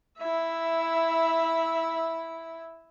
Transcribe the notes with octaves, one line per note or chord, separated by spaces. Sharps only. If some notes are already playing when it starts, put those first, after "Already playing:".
E4 E5